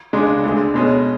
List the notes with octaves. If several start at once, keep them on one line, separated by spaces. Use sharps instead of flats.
C#2 C#3 G#3 D4
D2 D3 G#3
B2 G#3 C#4